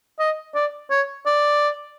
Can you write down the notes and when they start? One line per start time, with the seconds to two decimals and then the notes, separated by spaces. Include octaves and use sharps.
0.19 D#5
0.55 D5
0.90 C#5
1.26 D5